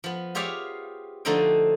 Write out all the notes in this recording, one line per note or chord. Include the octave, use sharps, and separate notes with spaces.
F3 B3
F4 G4 G#4 C#5 E5 F5
D3 F3 A3 D#4 C5 G5